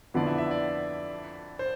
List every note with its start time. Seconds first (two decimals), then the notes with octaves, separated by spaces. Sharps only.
0.14 F2 D3 F3 B3 E4 D5
0.27 E5
0.38 E5
0.51 D5
1.59 C5